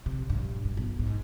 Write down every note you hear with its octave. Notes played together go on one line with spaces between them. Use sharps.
C3
A#1 G2
G2
B1 B2
G#2